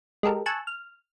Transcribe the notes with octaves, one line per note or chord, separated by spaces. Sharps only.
G#3 G4 A4 A#4
G#5 A5 C#6 E6 F#6
F6